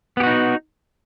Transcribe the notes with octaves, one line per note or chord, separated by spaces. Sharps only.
B3 D#4 F#4 G4